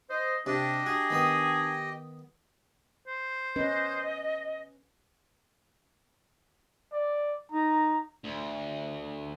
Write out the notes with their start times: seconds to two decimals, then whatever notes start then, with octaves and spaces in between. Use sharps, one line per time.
0.10 C5 D#5
0.46 C3 D4 G4 D#5
0.86 D4 F#4 G#4
1.10 D#3 B3 D#6
3.07 C5
3.56 C#4 B4 D#5
6.92 D5
7.52 D#4 A#5
8.24 D2